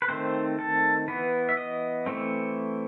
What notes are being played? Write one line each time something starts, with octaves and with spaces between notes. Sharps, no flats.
B4
D#3 A3 C4 C5
A4
E3 B3 B4
E5
D#5
E3 A3 C4